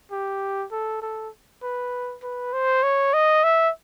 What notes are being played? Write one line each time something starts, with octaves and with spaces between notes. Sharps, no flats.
G4
A4
A4
B4
B4
C5
C#5
D#5
E5